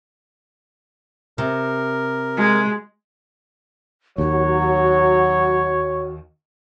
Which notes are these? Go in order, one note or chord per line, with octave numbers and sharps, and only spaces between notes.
C3 A#4
G#3
D#2 F#3 F#4 C#5